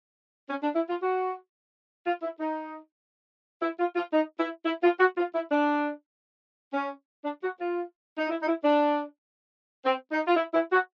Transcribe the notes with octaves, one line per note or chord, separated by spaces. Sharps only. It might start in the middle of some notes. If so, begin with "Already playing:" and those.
C#4
D4
E4
F4
F#4
F4
E4
D#4
E4
F4
F4
D#4
E4
E4
F4
F#4
F4
E4
D4
C#4
D4
F#4
F4
D#4
E4
D#4
E4
D4
C4
D#4
F4
E4
E4
F#4